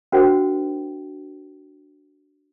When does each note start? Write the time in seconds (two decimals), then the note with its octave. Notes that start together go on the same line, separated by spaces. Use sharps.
0.12 D4 F#4 A#4 C5 F#5 G5